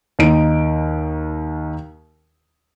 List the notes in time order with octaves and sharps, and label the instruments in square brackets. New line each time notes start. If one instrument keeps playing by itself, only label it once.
[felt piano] D#2 D#4 D7